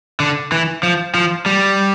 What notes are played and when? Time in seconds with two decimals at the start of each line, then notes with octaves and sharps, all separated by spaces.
0.20 D3
0.52 E3
0.83 F3
1.15 F3
1.46 G3